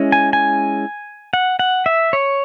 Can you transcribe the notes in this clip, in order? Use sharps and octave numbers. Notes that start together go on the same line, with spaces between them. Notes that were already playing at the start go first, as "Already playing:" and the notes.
Already playing: G#3 C#4 E4
G#5
G#5
F#5
F#5
E5
C#5